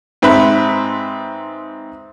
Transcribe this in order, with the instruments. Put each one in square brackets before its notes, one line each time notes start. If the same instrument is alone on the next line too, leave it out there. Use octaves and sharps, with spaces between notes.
[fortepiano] G#2 C4 B4 E5 B5